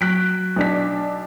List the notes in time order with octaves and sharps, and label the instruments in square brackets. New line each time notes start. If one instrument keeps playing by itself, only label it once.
[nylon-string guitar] F#3 [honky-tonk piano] F#6 B6 D7
[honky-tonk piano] B1 D4 B6